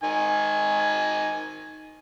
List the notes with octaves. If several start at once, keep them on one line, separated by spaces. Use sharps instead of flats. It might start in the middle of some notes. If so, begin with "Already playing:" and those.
D#3 G#5